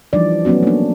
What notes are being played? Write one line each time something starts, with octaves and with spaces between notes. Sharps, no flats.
E3 F3 G3 D4 D#4 D5
F#3 A3 B3 C#4 F#4
A#3 D4